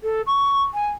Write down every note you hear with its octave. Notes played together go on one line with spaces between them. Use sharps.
A4
C#6
G#5